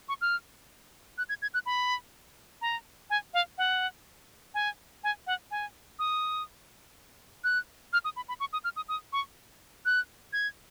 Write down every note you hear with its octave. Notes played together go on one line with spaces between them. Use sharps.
C#6
F6
F#6
G#6
G#6
F#6
B5
A#5
G#5
F5
F#5
G#5
G#5
F#5
G#5
D#6
F#6
F6
D#6
B5
B5
C#6
D#6
F6
D#6
D#6
C#6
F#6
G#6